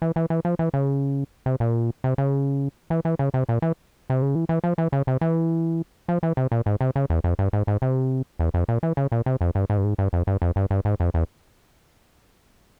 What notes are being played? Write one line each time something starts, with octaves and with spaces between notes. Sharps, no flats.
E3
E3
E3
F3
E3
C#3
C3
A#2
C3
C#3
E3
E3
C#3
C3
A#2
E3
C3
C#3
E3
E3
F3
E3
C#3
C3
E3
F3
E3
C3
A#2
G#2
C3
C#3
E2
F2
G2
G#2
G#2
C3
E2
F2
A#2
E3
C#3
A#2
C3
F2
G2
G#2
G2
G#2
G2
F2
G2
F2
G2
G2
G#2
F2
E2